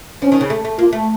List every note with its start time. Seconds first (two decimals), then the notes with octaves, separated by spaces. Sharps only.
0.22 F3 C#4
0.32 D#3
0.41 C#3
0.50 A3
0.65 A3
0.79 A#3 F4
0.93 A3